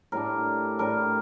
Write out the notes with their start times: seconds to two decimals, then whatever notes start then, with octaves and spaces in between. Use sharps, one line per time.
0.12 A2 G3 D4 A#4
0.79 A2 G3 D4 A#4